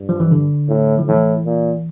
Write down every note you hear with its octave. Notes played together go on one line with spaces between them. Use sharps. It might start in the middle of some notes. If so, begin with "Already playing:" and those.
Already playing: G2
F3
E3
D3
A2
F3
A2 E3
A#2